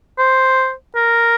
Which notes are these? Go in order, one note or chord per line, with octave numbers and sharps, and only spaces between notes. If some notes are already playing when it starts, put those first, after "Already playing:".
C5
A#4